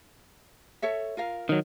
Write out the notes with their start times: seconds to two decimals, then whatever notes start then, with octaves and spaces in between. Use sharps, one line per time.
0.82 A4 C#5 E5
1.17 F4 A#4 F5
1.49 D#3 F#3